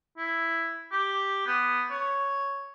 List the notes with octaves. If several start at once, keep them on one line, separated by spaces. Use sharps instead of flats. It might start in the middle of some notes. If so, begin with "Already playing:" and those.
E4
G4
B3
C#5